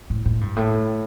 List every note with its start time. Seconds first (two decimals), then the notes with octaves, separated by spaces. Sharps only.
0.10 A2
0.26 A2
0.41 G2
0.56 A2